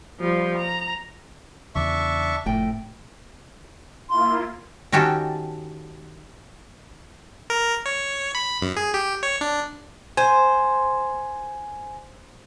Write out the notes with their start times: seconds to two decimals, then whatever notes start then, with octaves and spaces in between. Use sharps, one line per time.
0.20 F3 G3
0.57 A#5
1.75 E2 C#3 D4 E5 C#6
2.46 F1 A2 G5
4.09 A#3 E4 F4 C6
4.92 D#3 C#4 F#4 G4 A4
7.50 A#4
7.86 C#5
8.35 B5
8.61 F#2
8.76 G#4
8.94 G4
9.23 C#5
9.41 D4
10.17 C5 G#5